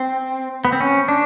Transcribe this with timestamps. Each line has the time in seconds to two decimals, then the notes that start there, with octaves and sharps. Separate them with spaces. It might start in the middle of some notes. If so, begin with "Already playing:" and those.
Already playing: C4
0.65 B3
0.73 C4
0.80 C#4
1.08 D4